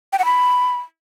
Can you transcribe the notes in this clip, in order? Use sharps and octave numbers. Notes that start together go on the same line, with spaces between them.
G5
F#5
B5